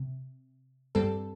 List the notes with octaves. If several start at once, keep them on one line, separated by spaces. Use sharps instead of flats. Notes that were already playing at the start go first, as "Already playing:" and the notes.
Already playing: C3
G2 G3 C4 A4